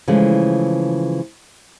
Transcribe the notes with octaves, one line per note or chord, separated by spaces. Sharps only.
C#3 E3 F3 G#3 A3